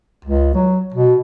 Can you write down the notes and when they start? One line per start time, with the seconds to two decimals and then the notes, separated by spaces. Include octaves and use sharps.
0.25 C#2
0.54 F#3
0.94 B2